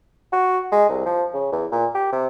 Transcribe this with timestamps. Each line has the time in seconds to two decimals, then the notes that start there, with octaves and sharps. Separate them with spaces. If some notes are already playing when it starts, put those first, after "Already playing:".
0.32 F#4
0.72 G#3
0.89 C2
1.06 F3
1.34 C#3
1.52 E2
1.72 A#2
1.95 G4
2.12 C3